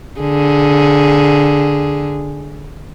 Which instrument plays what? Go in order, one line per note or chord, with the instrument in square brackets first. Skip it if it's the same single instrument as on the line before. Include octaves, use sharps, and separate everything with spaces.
[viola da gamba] D3 G#4